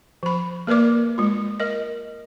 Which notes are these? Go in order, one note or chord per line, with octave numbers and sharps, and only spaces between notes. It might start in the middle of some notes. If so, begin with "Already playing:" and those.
F3 B5
A#3 A#4 B4 D5 D6
G#3 F4
A#4 D#5